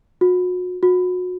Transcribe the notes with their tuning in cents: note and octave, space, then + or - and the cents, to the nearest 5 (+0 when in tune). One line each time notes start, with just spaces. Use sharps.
F#4 -35
F#4 -30